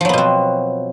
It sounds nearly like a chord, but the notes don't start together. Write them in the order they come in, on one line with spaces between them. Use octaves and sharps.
F3 F#3 B3 B2 C4